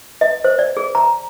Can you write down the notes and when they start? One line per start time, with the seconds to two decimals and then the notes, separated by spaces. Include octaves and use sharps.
0.21 D#5
0.44 C5
0.59 D5
0.77 G#4
0.95 A#5